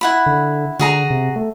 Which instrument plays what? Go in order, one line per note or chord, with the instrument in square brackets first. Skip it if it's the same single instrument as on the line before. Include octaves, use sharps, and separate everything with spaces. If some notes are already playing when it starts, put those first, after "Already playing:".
[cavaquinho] E4 F#5 B5
[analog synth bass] D3
[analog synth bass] D3 [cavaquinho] F#4 G#4 A#5
[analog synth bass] C3
A3